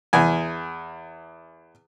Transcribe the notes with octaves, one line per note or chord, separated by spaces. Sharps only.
E2 G#5